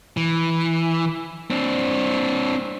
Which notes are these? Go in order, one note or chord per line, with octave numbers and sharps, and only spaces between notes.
E3
C4 D4